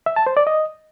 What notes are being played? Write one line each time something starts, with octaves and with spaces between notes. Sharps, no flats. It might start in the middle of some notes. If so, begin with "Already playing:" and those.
E5
A5
C5
D5
D#5